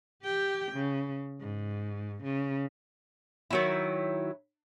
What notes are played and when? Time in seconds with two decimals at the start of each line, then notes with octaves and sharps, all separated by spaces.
0.24 G4 G5
0.73 C#3
1.41 G#2
2.24 C#3
3.51 D#3 F#3 E4